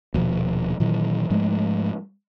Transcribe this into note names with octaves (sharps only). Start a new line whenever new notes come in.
D#1 B2 F3
A#2 D#3 E3 F#3
G#2 F3 G#3 A3